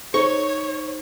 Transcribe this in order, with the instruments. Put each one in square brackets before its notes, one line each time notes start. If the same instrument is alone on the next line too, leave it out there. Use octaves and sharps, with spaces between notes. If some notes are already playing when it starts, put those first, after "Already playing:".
[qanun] D#4 [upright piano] C5 [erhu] C#5 [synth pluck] C#6